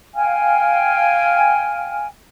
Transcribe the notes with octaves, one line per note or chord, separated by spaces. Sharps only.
F5 G5 G#5 F6